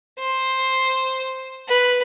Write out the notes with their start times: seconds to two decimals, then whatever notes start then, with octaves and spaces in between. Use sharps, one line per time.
0.19 C5
1.68 B4